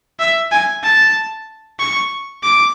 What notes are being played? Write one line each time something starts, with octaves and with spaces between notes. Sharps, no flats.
E5
G#5
A5
C#6
D6